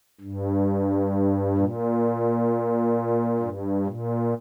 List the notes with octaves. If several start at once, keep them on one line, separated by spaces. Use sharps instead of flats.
G2
A#2
G2
A#2